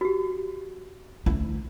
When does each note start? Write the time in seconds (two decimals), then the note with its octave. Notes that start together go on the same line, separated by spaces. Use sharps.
0.01 F#4 G4
1.26 D2 E4